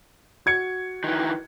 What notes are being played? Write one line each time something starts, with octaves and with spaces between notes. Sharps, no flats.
F#4 G#6 C#7
D#3 E3